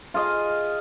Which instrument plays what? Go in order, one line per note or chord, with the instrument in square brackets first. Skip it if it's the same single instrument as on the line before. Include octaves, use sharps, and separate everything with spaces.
[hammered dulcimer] F4 G#4 D#5 F5